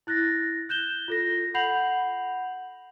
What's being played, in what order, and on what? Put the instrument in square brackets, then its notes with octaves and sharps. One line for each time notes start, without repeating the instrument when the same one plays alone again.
[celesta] E4 F#6 A6 A#6
F#6 G6 E7 G7
F4 A4 A#6
F#5 B5 G6 C7 F7 F#7